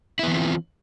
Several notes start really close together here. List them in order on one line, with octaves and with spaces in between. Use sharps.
E4 B3 E3 C4 F4